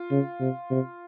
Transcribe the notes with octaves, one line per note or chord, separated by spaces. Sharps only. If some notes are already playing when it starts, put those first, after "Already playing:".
Already playing: F4
C#3
C3
C3